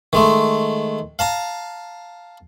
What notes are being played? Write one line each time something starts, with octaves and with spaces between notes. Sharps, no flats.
D#3 G#3 A3
F5 A5 A#5